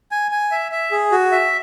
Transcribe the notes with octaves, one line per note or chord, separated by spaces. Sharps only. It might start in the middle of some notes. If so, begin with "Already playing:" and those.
G#5
G#5
E5
E5
G#4
F#4
E5